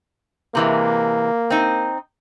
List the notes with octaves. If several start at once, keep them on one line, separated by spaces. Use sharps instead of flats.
C3 E3 G#3 A#3
C4 D#4